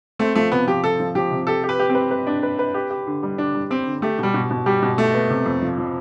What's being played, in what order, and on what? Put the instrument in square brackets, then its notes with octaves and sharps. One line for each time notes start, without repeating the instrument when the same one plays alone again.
[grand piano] A3 [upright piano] C4
[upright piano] F3 [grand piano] A3
[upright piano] C3 [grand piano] B3
[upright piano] F3 [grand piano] G4
[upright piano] C3 [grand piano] A4
[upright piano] F3
[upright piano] F3 [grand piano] G4
[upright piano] C3
[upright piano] G4 [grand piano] A4
[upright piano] G4
[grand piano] B4
[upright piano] G4
[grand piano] C4
[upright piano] B4
B4
D4
B4
B4
G4
G4
D3
G3
[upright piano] D3 [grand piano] D4
[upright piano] G3
[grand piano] C4 [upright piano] G4
[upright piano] D3
[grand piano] A3 [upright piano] G4
[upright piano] B2 [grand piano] G3
[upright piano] B2
B2
[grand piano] G3 [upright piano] G4
[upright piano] B2
[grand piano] A3 [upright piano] E4
[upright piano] B3
C3
F2
F3
F3